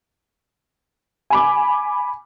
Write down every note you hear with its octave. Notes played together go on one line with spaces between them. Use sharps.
G#5 B5 D6